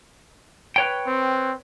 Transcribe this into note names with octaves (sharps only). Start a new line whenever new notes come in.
B4 C#5 G5
C4